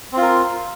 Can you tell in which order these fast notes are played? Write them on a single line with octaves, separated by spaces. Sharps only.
C4 F4 A#4